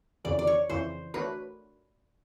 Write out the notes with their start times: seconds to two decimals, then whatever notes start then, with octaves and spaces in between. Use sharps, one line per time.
0.25 F2 C#3 E3 D5
0.39 D5
0.47 C#5
0.70 F2 C#3 E3 C5
1.14 A3 D4 F#4 A#4 B4 C#5